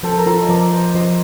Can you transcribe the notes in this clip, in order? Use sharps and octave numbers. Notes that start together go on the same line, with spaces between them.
F3 A4 C5
A#4
F4 A4 C5
D#5
F3 A#4 D5
F3 C5 D#5
F3 C5 D#5